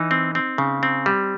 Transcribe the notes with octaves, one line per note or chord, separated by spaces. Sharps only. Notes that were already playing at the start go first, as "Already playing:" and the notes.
Already playing: E3 D#4
C4
C4
C#3
C4
G3